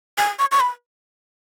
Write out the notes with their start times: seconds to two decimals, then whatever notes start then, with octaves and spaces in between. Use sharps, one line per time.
0.18 G#5
0.39 C#6
0.52 C#6
0.60 B5